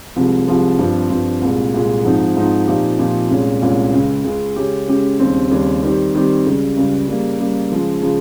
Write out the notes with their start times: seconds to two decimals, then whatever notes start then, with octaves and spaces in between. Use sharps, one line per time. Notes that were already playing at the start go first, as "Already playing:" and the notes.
0.16 C2 C3 F3 G#3
0.47 C2 C3 F3 G#3
0.79 G2 F3 C4
1.10 G2 F3 C4
1.41 C2 A#2 G#3
1.74 C2 A#2 G#3
2.05 G#2 F3 C4 D#4
2.37 G#2 F3 C4 D#4
2.67 A#2 F3 C4 D#4 G4
2.99 A#2 F3 C4 D#4 G4
3.31 C2 A#2 G#3 C#4
3.62 C2 A#2 G#3 C#4
3.94 C#2 C#3 G#3
4.25 C#2 C#3 G#3
4.56 C#3 G#3 C#4 G4
4.88 C#3 G#3 C#4 G4
5.19 D#2 C#3 G3 C4
5.51 D#2 C#3 G3 C4
5.83 D#3 G3 C4 G4
6.14 D#3 G3 C4 G4
6.46 C#2 C#3 G3
6.77 C#2 C#3 G3
7.08 C#3 G3 A#3
7.40 C#3 G3 A#3
7.72 C#3 F3 G#3
8.03 C#3 F3 G#3